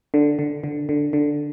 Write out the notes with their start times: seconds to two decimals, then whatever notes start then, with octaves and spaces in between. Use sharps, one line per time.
0.14 D3
0.39 D3
0.64 D3
0.89 D3
1.13 D3